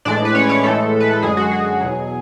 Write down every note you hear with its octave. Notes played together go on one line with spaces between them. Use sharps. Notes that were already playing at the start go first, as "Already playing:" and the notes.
A2 E3 G#3 D4 D5
B4
C#4 C#5
C#4 C#5
A2 E3 G#3 A3 A4
B4
A4
F#2 D3 G#3 G#4
F#4
G#4
E2 B2 F#3